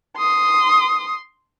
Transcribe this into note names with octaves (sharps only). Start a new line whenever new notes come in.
C6 D#6